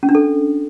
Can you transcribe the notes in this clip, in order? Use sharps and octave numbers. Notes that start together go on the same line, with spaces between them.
C#4
D4
A4